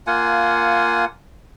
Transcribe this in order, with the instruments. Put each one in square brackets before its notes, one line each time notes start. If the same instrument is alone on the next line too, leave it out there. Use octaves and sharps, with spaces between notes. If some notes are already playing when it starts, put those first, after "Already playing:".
[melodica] A#3 F4 F#5 G#5